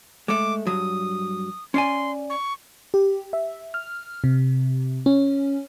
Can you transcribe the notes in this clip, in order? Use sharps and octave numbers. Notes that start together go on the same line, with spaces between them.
G#3 A3 D6
G2 F#3 D#6
C#4 D5 G#5 C6
C#6
G4
E5
F6
C3
C#4